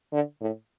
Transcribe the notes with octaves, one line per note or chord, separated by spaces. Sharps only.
D3
A2